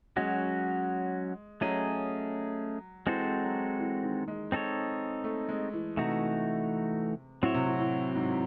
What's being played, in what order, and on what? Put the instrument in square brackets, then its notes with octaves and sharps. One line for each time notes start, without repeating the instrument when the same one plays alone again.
[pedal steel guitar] F#3 C#4 F#4 [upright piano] G#3
[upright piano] F#3 [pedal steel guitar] A3 C#4 G#4 D#5
[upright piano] E3 [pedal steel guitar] G#3 C4 F#4 A4 C5
[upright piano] F#3
E3
D#3
G#3
[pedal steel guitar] C4 D#4 A4 C#5
[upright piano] A3
G#3
E3
[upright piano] C3 [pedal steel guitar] E3 A3 D#4 F#4
[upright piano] A2 [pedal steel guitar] F#3 C4 F#4 C#5 E5
[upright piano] C3
A2
A2
G#2